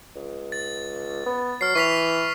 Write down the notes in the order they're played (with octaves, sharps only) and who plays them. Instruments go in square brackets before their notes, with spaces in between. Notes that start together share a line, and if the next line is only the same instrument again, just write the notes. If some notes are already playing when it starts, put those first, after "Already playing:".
[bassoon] C#2
[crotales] A6
[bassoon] B3
[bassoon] F#3 [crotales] F6 C7
[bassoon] E3 [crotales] C#6 B6 F7